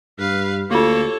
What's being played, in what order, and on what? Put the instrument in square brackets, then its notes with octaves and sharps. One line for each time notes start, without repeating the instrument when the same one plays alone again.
[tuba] G2 [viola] B4 F5
[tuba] D2 [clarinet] A#3 [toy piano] F4 G4 [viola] A4 C#5